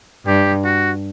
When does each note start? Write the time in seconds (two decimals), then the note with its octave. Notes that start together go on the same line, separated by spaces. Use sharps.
0.26 G2 G4
0.64 F#4